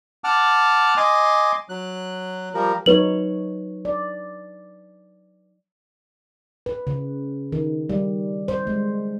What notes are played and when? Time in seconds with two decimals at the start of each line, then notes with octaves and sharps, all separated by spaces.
0.24 F#5 A5 D6 F6
0.97 D#5 G#5 C6 D6
1.69 F#3 F#6
2.54 F3 G3 A#4
2.86 F#3 D#4 B4 C#5 F#7
3.85 D5
6.66 B4
6.87 C#3
7.52 D#3
7.89 G3
8.48 C5
8.67 G#3